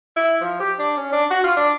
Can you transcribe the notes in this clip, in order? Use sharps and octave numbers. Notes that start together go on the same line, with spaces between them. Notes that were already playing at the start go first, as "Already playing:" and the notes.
E4
F3
G4
D4
C#4
D4
F#4
F4
D4